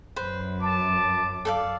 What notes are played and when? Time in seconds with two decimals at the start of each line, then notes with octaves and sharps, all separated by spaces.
0.16 F#2 B4 C5
0.62 A5 D6
1.45 A4 D5 F5